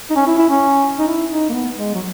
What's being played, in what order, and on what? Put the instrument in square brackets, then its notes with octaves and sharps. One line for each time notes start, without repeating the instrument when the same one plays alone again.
[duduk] D#4
C#4
E4
E4
C#4
D#4
E4
D#4
A#3
B3
G#3
F#3